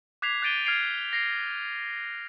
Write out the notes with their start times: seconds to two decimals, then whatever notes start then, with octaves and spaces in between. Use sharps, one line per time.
0.22 D6 F#6 G#6 B6 C7 F7
0.42 F#6 G6 A6 D7 D#7 G7
0.65 F6 G#6 C7 D7 F7
1.13 A#6 C7 D7